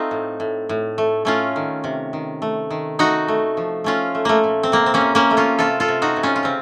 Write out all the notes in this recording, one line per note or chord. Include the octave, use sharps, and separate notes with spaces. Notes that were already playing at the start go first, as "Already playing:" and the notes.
Already playing: A3 C4 D#4 F4
A2
A2
A2
A3
A3 C#4 F4
D#3
C3
D#3
A3
D#3
A3 D#4 F#4
A3
F3
A3 C#4 F4
A3
A3 A#3
A#2
C4
C3 A#3
C4
A#3 C#4
C3
A#3 C#4
A3
C#4 F4
C3 F4 A4
F4 A4
C3
D#4 F#4
C3
C#4 F4
F4
C#3 C4